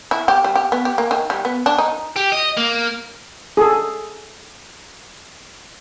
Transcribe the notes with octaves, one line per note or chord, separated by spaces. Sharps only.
E4
G4
G3
G4
B3
G4
A#3
D#3
G3
B3
D4
D#4
G4
D#5
A#3
G#4 A4